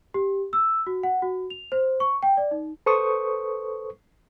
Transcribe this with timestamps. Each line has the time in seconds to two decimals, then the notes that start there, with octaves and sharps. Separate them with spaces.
0.14 G4
0.53 E6
0.87 F#4
1.03 F#5
1.22 F#4
1.50 F7
1.72 C5
2.00 C#6
2.23 G5
2.37 D5
2.51 D#4
2.86 A4 B4 C5 C#6 D#6